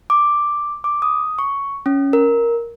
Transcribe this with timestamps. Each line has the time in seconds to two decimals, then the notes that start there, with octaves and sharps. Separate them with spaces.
0.10 D6
0.84 D6
1.02 D#6
1.39 C#6
1.86 C#4
2.13 A#4